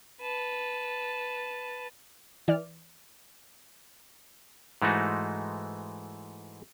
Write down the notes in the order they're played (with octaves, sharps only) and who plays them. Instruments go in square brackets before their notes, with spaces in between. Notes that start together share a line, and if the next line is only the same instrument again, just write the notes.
[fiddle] B4 A5
[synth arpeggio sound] E3 D5 F6
[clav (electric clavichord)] G#2 E3 G#3 A3 D#4 F#4